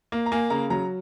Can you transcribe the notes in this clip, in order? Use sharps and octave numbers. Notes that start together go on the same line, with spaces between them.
A#3
A#5
A#3 G#5
C#3 A#5
F#3 A#5